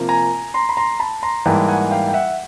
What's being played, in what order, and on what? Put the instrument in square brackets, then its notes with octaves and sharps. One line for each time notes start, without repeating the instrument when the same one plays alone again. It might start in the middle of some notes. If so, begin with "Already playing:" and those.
Already playing: [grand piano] C3 F3 A#3
G#5 A#5
A#5 C6
B5
A#5 C6
A5 B5
A#5 C6
G#2 E3 G3 A#3 G5 A5
F#5 G#5
F5 G5
G5
E5 F#5